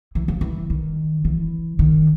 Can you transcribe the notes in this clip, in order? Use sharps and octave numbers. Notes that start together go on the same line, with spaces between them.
E3
F3
E3
D#3
E3
D#3